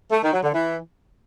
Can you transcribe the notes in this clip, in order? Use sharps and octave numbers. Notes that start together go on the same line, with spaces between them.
A3
D#3
F#3
D3
E3